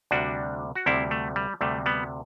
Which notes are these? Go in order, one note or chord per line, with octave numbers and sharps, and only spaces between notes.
D2 C3 G3 D4 F#4
F#4
D2 C3 G3 C4 E4
A3
G3
D2 C3 G3 A3
G3 B3